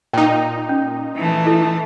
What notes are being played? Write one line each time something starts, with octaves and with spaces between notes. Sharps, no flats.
A#2 D#4 G5
C#4
E3 A3
E4 A4